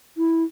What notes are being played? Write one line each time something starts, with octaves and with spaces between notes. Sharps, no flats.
E4